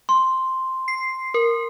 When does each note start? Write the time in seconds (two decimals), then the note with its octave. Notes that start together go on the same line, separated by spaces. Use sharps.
0.09 C6
0.88 C7
1.34 A#4